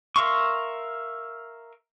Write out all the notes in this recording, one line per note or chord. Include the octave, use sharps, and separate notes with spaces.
A#4 E5 F5 C6 C#6